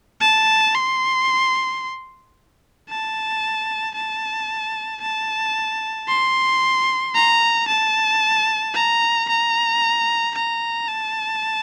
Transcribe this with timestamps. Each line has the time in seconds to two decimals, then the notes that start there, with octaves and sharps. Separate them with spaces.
0.21 A5
0.76 C6
2.89 A5
3.95 A5
5.02 A5
6.08 C6
7.15 A#5
7.68 A5
8.74 A#5
9.29 A#5
10.35 A#5
10.88 A5